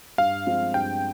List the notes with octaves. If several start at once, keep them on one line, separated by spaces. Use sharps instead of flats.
G2 F5
F3 G#3 C4 F4
G2 G5